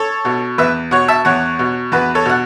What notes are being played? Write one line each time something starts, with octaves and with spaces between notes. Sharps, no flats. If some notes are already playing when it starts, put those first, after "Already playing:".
Already playing: A4 C#5
B2
E2 B4 E5
B2 C#5 F#5
E5 A5
E2 C#5 F#5
B2
E2 F#4 B4
A4 C#5
B2 F#5